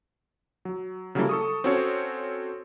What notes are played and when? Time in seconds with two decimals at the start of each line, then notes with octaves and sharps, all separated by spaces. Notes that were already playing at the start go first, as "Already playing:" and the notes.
0.65 F#3
1.15 C#3 F#3 G3 A#3 E4 A4
1.29 A4 C#6 D#6
1.64 C4 C#4 F#4 A4 C5 C#5